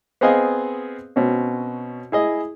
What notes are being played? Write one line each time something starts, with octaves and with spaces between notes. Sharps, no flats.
B3 C4 G#4 D#5 F5 G#5
B2 C4 C#4
E4 G#4 D#5